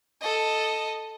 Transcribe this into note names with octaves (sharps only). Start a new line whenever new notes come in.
A4 D#5